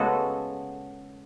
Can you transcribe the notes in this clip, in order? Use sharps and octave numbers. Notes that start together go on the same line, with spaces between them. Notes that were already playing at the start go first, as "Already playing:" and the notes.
Already playing: C#3 G#3 B3 F#4 A4